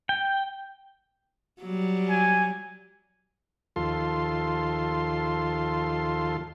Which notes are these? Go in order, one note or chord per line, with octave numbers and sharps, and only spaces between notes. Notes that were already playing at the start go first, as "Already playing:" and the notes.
G5
F#3 G3
G#5
D#2 F3 F4 A4 C6